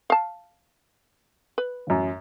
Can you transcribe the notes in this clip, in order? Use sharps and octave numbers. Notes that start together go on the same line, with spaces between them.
F5 A5
B4
A1 F#2